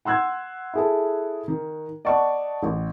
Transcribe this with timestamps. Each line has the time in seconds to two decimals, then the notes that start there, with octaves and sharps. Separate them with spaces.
0.05 F#5 C6 E6 F#6 G#6
0.74 E4 G#4 A4
1.48 D#3
2.05 D5 D#5 F#5 A5 C#6
2.63 A1